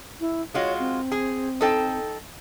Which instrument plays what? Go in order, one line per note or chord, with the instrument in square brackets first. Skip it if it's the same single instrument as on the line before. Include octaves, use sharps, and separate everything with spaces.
[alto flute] E4
[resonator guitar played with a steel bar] G#3 F4 F#4 [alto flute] C#5
[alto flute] C4
[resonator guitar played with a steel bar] G#4
D#4 A4 G5